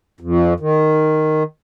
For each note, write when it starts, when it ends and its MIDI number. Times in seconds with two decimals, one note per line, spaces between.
0.20 0.54 41
0.60 1.43 51